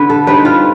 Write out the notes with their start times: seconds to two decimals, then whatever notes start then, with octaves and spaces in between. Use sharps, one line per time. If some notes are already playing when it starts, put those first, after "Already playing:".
Already playing: D3 B4
0.10 A4
0.27 G3 C4 D#4 B4
0.45 F4